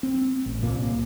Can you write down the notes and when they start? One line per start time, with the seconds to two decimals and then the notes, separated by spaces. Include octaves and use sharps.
0.03 C4
0.46 A1
0.62 C2 A#2 A#3